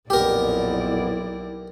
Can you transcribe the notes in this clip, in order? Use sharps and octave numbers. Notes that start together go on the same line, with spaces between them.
B1 F2 A#2 B3 E4 G4 A#4 D5